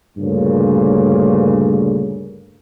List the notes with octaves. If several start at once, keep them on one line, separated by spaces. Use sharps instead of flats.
D2 G2 A#2 C#3